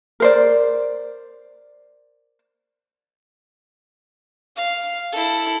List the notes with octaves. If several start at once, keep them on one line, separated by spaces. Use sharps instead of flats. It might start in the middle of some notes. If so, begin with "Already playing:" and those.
A#4 C5 D5
F5
E4 A4